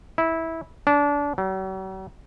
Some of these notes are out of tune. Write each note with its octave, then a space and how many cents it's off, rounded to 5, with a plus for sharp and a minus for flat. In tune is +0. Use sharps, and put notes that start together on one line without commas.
E4 -15
D4 -25
F#3 +45